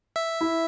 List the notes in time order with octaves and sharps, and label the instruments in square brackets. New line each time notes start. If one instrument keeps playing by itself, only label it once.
[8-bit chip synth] E5
[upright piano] E4